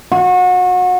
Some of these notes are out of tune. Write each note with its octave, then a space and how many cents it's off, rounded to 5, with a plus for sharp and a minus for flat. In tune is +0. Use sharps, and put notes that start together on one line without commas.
F#4 -30